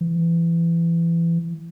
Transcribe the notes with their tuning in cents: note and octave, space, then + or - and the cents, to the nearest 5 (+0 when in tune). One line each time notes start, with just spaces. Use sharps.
E3 +25